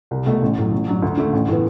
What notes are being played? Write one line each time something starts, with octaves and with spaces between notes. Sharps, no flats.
C2
B2 A3
A1
A2 F#3
A1
G2 F#3
D2
D3 A3
A1
A2 E3 B3